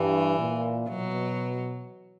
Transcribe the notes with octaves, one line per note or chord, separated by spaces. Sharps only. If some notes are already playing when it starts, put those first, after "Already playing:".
Already playing: G2 E3
A#2
B2 F#3